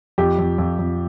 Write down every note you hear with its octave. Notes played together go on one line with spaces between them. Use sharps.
F2 G4
F2
F2
F2